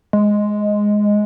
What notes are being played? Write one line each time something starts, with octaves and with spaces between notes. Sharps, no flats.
G#3